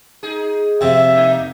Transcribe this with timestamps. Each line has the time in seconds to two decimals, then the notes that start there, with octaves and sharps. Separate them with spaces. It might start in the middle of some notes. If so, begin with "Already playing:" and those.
0.23 D#4 G#4
0.81 F2 C3 E5
1.14 A3 A#3 D#4